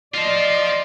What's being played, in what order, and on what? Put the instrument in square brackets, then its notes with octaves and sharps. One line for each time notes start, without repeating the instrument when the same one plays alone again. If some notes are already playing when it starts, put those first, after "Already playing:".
[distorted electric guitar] F4 C5 [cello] D5 D#5